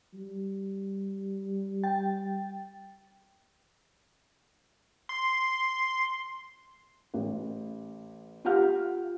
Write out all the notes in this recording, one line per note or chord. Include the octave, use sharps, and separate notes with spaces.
G3
G5 A6
C6
A1
F4 G4 F5 F#5 F6